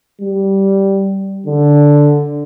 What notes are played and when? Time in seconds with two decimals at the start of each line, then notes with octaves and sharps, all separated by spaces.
0.21 G3
1.46 D3